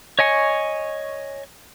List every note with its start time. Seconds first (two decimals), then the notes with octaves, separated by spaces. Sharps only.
0.19 C#5 D#5 G#5 C#6